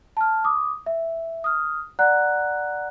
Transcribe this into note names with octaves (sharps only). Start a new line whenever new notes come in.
A5 F6
D6 D#6
E5
D#6 F6
D5 F#5 A#5 F#6